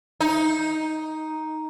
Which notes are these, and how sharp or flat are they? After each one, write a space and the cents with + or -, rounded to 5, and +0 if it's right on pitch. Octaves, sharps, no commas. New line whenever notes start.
D#4 +5